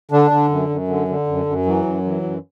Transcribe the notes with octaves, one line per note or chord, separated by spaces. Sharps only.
D3 D4
D3
F#2
F#2
D3
D3
F#2
F#2
E3 F#3
F#2
E3
F#2